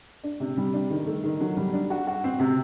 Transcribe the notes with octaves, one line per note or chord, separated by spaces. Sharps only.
D4
C3
G3
D4
D#3
A3
D#3
F#3
G3
D4
F#4
F#4
C4
C3